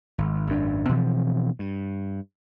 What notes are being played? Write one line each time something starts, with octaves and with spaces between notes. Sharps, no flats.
G#1
G#1 F#2 D4
B2 E3 F3 C4
G2